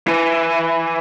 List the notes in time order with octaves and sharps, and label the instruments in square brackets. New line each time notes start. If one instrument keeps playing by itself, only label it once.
[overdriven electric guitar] E3